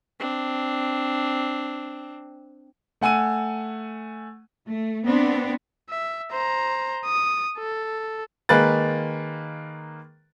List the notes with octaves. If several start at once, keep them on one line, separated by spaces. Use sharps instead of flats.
C4 D4
A3 F#5 G#5 E6 D#7
A3
B3 C4 D4
E5
C5 A#5
D#6
A4
D#3 G#3 A#3 B4 F#6 A6